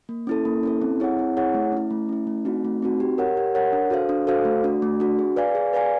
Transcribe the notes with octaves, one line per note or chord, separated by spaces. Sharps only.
A#3
C#4 E4 A4
A#3
C#4 E4 A4
C4
E4 G#4 C#5 F#5
C4
E4 G#4 C#5 F#5
A3
C#4 E4
A3
C#4 E4
A3
C4 D#4 F#4
A3
C4 D#4 F#4
G4
A#4 C#5 F#5
G4
A#4 C#5 F#5
D4
F#4 A4 C5 F5
D4
F#4 A4 C5 F5
A3
D4 F#4
A3
D4 F#4
G#4
B4 D5 F5 G#5
G#4
B4 D5 F5 G#5